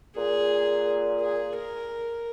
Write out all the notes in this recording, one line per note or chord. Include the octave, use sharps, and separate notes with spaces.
A#2 G#4
G#4
A#4